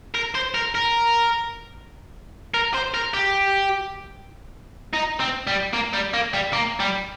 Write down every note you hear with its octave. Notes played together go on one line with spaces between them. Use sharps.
A#4
C5
A#4
A#4
A#4
C5
A#4
G4
D#4
C4
G3
A#3
G3
A#3
G3
A#3
G3